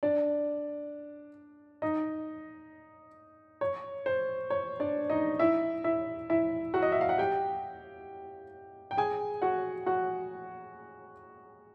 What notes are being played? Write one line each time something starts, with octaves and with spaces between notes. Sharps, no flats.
D4 D5
D#4 D#5
C#5
C5
C#5
D4 D5
D#4 D#5
E4 E5
E4 E5
E4 E5
F#4 F#5
D#5
E5
F5
F#5
G4 G5
G5
G#4 G#5
F#4 F#5
F#4 F#5